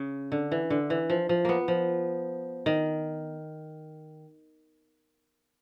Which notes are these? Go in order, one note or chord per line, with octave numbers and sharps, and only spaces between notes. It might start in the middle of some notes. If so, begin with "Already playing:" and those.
Already playing: C#3
D3
E3
D3
E3
F3
F3
A#3 B3
F3
D#3